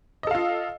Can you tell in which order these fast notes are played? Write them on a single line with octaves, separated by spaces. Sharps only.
D#5 A4 F5 F4